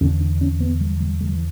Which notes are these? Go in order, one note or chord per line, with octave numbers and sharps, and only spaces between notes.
E2 D3 C#4
D4
C#4
B3
G3
G3
G3
E3